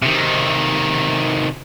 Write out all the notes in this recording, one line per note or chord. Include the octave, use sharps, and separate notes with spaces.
C3 D#3